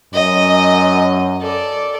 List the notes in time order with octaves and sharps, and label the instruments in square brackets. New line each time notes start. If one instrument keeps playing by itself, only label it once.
[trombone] F#2 [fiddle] D#5
[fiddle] A4 D5